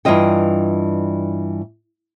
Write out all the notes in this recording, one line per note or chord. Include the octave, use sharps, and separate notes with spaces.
G2 E3 F4 D#5 G5